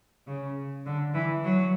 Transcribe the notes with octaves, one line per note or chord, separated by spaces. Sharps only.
C#3
D3
E3
F#3